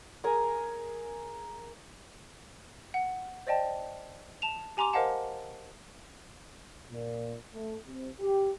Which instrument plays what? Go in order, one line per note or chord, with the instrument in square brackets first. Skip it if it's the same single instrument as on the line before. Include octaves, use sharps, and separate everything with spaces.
[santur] G#4 A#4 G#5 A#5
[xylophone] F#5
C5 D5 D#5 G5 A5
A5 E7 F7
G4 G#5 A#5 C6 D6 F7
A#4 C5 D#5 F5 F#5 A5
[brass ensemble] A#2
A3
C3
G4